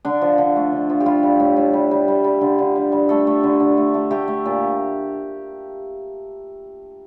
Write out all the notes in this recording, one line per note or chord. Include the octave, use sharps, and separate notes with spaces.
D3 D4
F3
D3
A3
D3
F3
G4
G3 F4
G3
A2
A2
G3
G3
G3
G3
D3
D3
G3
G3
A3 A4
A3
D3
D3
A3
A3
A3 G4
A3
A#2